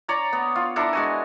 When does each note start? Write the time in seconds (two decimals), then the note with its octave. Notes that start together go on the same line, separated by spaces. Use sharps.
0.08 C#5 D5 A#5
0.33 B3
0.55 F4
0.76 D4 E4 A4 A#4
0.93 G#3 F#4 G#5